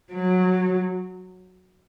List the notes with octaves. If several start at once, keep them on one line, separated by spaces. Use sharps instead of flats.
F#3